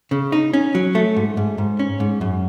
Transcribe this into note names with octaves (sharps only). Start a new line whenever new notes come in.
C#3
D#4
C#4
F#3
A3
G#2
G#2
G#2
C#4
G#2
F#2